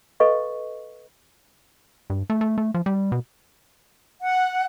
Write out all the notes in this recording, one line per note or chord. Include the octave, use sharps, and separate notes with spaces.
A4 B4 D#5 F5 C#6
G2
A3
A3
A3
F3
G3
B2
F#5